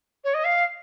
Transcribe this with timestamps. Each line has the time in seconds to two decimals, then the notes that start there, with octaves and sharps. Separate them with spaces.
0.24 C#5
0.34 D#5
0.44 F5